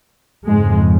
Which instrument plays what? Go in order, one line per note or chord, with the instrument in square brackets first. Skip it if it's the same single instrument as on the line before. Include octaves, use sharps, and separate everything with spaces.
[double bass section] F2 G#2 C#3 G#3